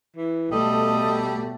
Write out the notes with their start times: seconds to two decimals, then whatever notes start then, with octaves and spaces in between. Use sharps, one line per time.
0.16 E3
0.51 B2 G3 A3 A4 D#5